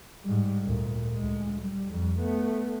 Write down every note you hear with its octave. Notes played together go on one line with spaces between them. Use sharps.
G#2 G3
D2 A#2
D2 G#3
G3
F2 G3
A3 B3